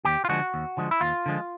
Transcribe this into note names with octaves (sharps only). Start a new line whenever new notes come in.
D#2 G4
F4
D3 F3 G#3 F#4
D#2
D3 F3 G#3
E4
D#2 F4
D3 F3 G#3